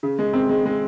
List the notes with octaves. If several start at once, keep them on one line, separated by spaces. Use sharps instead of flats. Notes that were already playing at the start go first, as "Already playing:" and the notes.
C#3
G#3
C4
G#3
G#3